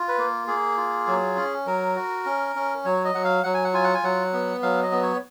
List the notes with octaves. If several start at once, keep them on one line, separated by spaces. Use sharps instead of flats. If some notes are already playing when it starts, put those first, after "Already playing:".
Already playing: F4
B4
A#3
A#3 G#4
F4
F#3
C#4
F#3 A#4
F#4
C#4
C#4
F#3 C#5
D#5
F#3 F#5
F5
F#3 F#5
G#5
F#5
F4 G#5
F#5
G#5
F#3 F#5
B3
F#3 F5
D#5
B3
C#5